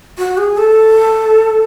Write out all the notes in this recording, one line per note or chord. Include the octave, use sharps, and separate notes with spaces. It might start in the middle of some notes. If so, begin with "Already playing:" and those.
F#4
G#4
A4